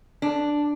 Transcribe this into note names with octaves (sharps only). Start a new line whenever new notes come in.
D4